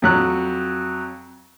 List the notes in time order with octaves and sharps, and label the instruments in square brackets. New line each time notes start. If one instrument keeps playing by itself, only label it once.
[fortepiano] F2 F#3 F#6